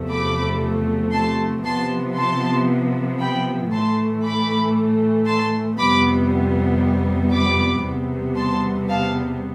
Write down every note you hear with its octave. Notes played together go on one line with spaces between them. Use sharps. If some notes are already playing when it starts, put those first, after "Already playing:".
Already playing: E2 C3 F3 A3
B5 D6
A5 C6
C3 F3 B3 A5 C6
A5 C6
G5 B5
A2 E3 A3 A5 C6
B5 D6
A5 C6
F2 C3 G3 B3 B5 D6
B5 D6
E2 C3 G3 B3
A5 C6
F5 A5